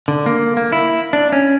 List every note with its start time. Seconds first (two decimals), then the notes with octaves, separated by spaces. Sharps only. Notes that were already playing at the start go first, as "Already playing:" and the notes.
0.08 D3
0.26 A#3
0.57 A#3
0.72 E4
1.13 D4
1.32 C#4